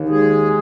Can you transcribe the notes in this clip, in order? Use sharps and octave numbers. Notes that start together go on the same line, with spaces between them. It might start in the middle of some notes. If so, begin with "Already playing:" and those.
Already playing: D#2
G#3 G#4